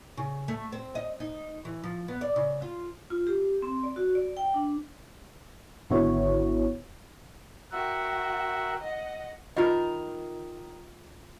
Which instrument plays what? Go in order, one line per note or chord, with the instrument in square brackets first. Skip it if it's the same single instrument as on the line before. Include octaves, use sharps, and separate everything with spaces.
[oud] C#3
A3
C4
D#5
D#4
E3
F3
B3
D5
C#3
F4
[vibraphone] F4
G4
C4
D5
F#4
D5
G5
D4
[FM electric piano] G#1 D3 B3 E4 F#4 C#5
[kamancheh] F#4 G5 [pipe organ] A#4 E5 F#5
[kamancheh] D#5 F#5
[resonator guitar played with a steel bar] D#3 A#4 [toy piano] F4 D#5